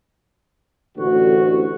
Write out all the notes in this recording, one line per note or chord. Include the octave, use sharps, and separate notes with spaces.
A1 D2 F#4